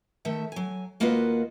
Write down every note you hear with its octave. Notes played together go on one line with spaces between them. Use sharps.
D#3 A3 E5
F#3 G#5
D#2 A#3 F4 F#4 B4 D#5